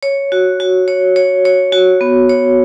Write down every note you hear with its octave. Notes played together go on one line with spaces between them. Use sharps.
C#5
F#4
F#4
C#5
C#5
C#5
F#4
B3
C#5